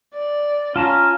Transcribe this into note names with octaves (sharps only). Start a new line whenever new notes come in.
D5
C#4 F4 A5 A#5